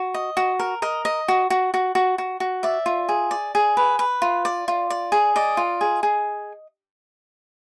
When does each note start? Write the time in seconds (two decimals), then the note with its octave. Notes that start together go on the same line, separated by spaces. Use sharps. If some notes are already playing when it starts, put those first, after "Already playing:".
Already playing: F#4
0.14 D#5
0.37 F#4
0.59 A#4
0.82 A#4 D#5
1.05 D#5
1.28 F#4
1.50 F#4
1.74 F#4
1.95 F#4
2.18 F#4
2.40 F#4
2.63 D5 E5
2.86 F4
3.09 G#4
3.31 D5
3.55 G#4
3.77 B4
3.99 B4
4.22 F4
4.45 D5
4.68 F4
4.90 D5
5.12 G#4
5.36 D5 D#5
5.57 F4
5.81 G#4
6.03 G#4